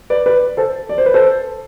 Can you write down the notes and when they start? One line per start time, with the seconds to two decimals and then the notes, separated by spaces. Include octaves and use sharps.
0.10 B4 D5
0.26 B4 D5
0.57 A4 C5
0.89 D5
0.98 C5
1.06 B4
1.14 A4 C5